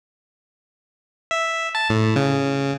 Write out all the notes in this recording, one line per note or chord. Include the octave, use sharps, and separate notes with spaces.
E5
A5
A2
C#3